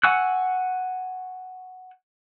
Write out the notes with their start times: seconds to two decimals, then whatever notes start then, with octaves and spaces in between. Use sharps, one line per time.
0.03 F#5 G#5 C#6 E6 F#6